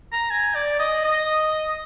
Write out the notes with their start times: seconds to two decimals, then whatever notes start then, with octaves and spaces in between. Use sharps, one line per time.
0.13 A#5
0.30 G#5
0.55 D5
0.79 D#5
1.05 D#5